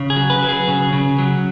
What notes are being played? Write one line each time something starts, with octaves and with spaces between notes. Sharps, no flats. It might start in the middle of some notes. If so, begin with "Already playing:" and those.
Already playing: C#3
G#4
F#3
B4
F#3
G#4
C#3
C#3
F#3